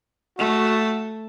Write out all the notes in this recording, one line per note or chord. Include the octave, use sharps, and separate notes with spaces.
A3 F#4